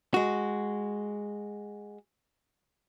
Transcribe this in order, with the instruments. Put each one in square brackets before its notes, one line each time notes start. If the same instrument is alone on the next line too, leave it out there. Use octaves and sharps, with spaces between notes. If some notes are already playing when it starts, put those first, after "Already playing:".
[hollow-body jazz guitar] G#3 F#4